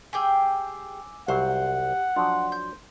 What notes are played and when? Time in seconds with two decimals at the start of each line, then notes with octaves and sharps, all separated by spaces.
0.13 G4 G#4 G5 G#5 D6 E6
1.28 C2 F#3 G4 C5 F5 F#5
2.16 F3 F#3 D4 C6
2.52 G6